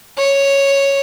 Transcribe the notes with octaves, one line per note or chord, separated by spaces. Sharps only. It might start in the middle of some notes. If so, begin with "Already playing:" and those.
C#5